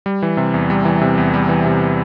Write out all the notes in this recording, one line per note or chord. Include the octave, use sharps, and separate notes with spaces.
G3
E3
C3
E2
G3
E3
C3
E2
G3
E3
C3